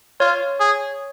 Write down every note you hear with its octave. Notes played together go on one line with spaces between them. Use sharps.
F4 C#5
G#4